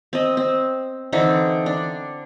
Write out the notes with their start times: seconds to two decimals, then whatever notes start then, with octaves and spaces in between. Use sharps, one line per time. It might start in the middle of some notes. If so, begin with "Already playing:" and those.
0.13 C4 D#5
0.37 C4
1.13 D3 E3 C4 D#4
1.66 D4